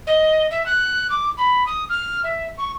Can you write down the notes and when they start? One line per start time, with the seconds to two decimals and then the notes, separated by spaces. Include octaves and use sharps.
0.07 D#5
0.51 E5
0.66 F#6
1.10 D6
1.37 B5
1.66 D#6
1.89 F6
2.24 E5
2.58 C#6